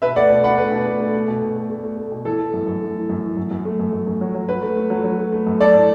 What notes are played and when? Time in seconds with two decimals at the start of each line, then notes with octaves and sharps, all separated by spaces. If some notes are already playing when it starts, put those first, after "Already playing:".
0.02 B2 B4 E5
0.16 A3 D5 F#5
0.30 B2
0.44 B2 F#5 B5
0.58 A3 B4
0.72 B2
0.86 A3
1.00 A3
1.14 A3
1.28 B2
1.42 B2
1.56 A3
1.70 A3
1.83 A3
1.97 A3
2.12 B2
2.25 E3 A4
2.39 E3
2.54 F#2
2.67 F#2
2.82 A3
2.96 E3
3.10 F#2
3.24 E3
3.37 F#2
3.51 F#2
3.65 A3
3.79 F#2
3.93 F#2
4.07 F#2
4.21 F#3
4.34 F#3
4.49 F#3 B4
4.63 A3
4.77 A3
4.90 F#3
5.04 F#3
5.18 A3
5.33 A3
5.47 F#2
5.60 A3 A4 D5
5.74 A2